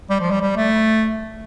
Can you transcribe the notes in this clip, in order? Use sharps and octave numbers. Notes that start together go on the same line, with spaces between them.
G3
F3
G3
G3
A3